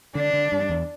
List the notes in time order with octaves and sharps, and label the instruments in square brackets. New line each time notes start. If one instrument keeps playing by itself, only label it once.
[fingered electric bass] D3 [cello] D4
[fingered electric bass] D3
G2
E2